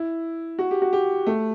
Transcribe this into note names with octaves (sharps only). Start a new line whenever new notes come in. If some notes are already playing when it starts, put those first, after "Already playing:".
Already playing: E4
F#4
G4
F#4
G4
A3